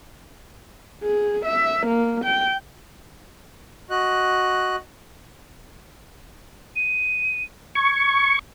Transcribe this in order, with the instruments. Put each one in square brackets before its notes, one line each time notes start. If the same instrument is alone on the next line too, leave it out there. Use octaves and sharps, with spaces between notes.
[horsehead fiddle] G#4
E5
A#3
G5
[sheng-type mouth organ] F#4 D#5 F#6
[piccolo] D#7
[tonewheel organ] C#6 [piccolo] G#6